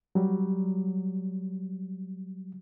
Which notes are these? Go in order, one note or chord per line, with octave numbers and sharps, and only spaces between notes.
F#3 G3